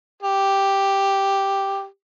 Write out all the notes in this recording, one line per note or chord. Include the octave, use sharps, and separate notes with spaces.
G4